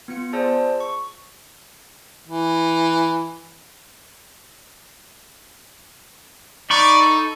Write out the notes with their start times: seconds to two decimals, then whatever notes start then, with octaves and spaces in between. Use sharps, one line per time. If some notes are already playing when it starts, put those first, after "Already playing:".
0.08 B3 F4 C#7
0.33 F4 G#4 C5 D5 A5 E6
0.80 C#6
2.28 E3
6.70 D#4 D5 B5 C#6
7.02 A4